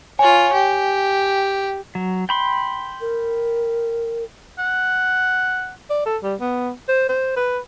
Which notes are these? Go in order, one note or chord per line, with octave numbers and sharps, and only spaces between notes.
F4 C#5 G#5
G4
F#3
G5 B5 C6
A#4
F#5
D5
A4
G3
B3
C5
C5
B4